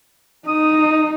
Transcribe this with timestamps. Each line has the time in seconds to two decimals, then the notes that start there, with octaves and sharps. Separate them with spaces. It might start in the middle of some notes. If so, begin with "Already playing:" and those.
0.48 D#4 D#6